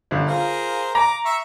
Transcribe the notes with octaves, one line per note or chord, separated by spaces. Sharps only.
G1 D3
F4 G#4 A#4 C5
A#5 D6 A#6
E5 C#6